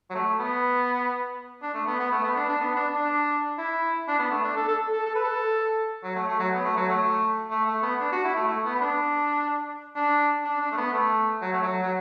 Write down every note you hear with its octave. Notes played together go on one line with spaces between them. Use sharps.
F#3
A3
B3
D4
A3
B3
B3
A3
B3
D4
D4
B3
D4
D4
E4
D4
B3
A3
D4
A4
A4
A4
A4
B4
A4
F#3
A3
A3
F#3
B3
A3
F#3
A3
A3
A3
B3
D4
F#4
E4
A3
A3
B3
B3
D4
D4
D4
D4
A3
B3
A3
F#3
A3
F#3
F#3